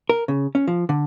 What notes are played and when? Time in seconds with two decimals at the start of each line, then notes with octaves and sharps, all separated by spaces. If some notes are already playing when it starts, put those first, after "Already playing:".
0.09 A#4
0.28 C#3
0.55 C#4
0.68 F3
0.89 D3